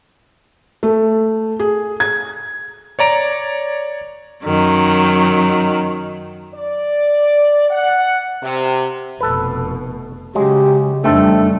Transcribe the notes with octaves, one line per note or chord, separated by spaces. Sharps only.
A3
G#4
G#6
C#5 D5 A#5 D7
F#2 D#3 F#3
D5
F#5
C3
F1 B2 A4 B4
C#3 F#3 G#3 G4
F2 D#3 G3 A3 C4 D4 A4